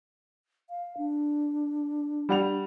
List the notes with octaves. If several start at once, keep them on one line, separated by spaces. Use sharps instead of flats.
F5
D4
G3 F#5 F7